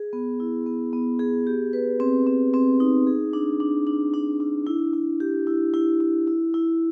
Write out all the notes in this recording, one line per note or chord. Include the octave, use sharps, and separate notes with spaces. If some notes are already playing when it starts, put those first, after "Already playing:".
Already playing: G#4
B3
E4
B3
B3
G#4
G4
B4
C4
C4
C4
D#4
G#4
D4
D4
D4
D4
D4
E4
E4
G4
E4
E4
E4
E4
E4